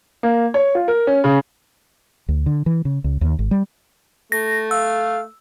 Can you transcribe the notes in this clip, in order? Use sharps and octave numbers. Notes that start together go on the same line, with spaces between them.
A#3
C#5
F4
A#4
C#4
C#3
D2
D3
E3
C#3
C#2
D#2
G#1
G3
A3 A#6
F5 E6